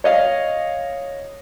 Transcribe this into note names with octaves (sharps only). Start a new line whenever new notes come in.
C#5 D#5 F5